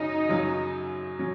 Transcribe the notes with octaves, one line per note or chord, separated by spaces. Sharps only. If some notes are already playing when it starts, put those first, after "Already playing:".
Already playing: F#2 C#3 F#3 C#4 D#4
F#2 C#3 F#3 C#4
F#3 C#4